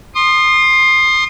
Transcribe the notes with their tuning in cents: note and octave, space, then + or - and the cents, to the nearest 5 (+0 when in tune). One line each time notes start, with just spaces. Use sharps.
C6 +15 D#6 -30